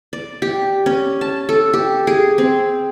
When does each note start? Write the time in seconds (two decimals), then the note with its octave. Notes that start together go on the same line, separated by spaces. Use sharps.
0.13 D5
0.42 G4
0.86 C#4
1.21 A5
1.49 A4
1.73 G4
2.07 G#4
2.38 C4